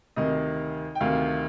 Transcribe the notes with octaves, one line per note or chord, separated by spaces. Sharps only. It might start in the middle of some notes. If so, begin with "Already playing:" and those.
D2 C3 D#3 D#5
G5
D2 C3 D#3 F5